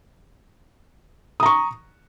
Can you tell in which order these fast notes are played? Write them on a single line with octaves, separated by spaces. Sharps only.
D#6 A#5 C#6